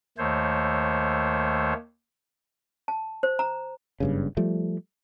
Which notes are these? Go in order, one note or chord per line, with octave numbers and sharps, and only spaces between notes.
D#2 D#3 A3 C5 C#5
A5
C5
A#5
F#1 G2 C#3
F3 G3 A3